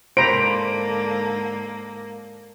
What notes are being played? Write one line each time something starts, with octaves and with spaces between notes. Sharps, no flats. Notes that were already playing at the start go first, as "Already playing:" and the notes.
G#2 D3 A#3 C5 A#5 B5 D7